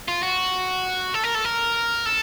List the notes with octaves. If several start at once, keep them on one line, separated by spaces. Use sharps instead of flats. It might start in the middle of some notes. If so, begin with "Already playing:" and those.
F4
F#4
A4
A#4
A4
A#4
A4